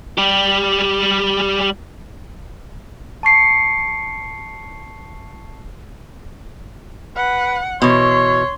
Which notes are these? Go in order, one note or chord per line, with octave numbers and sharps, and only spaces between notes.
G3 G4
A5 C#6 C7 C#7
B4 F#5
B2 E3 C#5 C6